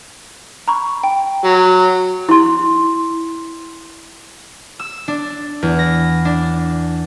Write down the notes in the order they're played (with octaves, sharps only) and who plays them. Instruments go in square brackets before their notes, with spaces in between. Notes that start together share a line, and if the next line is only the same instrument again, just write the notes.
[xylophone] A#5 B5 C#6
G5
[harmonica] F#3
[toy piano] E4 C6
[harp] E6
D4
E2
A#6
D4